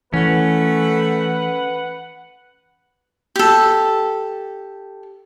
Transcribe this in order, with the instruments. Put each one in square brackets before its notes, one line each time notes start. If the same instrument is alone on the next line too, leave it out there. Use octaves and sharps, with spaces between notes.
[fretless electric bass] E3 [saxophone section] A3 [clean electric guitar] C#4 [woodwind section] B4 F#5
[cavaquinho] G4 A4